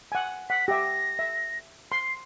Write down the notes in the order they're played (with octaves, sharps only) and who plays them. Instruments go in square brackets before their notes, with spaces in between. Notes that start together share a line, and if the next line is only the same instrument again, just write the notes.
[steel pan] F#5 G#5
[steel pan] F#5 [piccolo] B6
[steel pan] G4 E5 [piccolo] A#6
[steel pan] E5
[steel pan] C6 [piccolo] C7